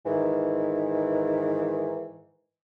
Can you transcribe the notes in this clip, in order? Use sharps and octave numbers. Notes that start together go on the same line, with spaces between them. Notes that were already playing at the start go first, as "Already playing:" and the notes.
G#2 D#3 E3